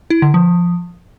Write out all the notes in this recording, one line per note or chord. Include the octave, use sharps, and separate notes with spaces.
E4
D3
F3